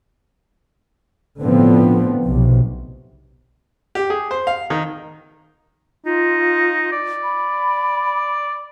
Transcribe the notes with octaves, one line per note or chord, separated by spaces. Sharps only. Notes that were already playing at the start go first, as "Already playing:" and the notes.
A2 D3 F3 B3 C4
B1 C3
G4
G#4
C5
F5
D#3
D#4 F4
D5
B5